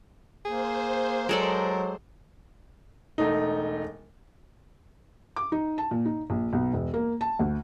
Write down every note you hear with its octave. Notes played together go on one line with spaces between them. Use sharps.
A#3 G#4 C5
F#3 G#3 A4 A#4 D5
E1 A3 D#4
D6
D#4
A5
A#2
D#4
A#1
B1
E1
A#3
A5
D2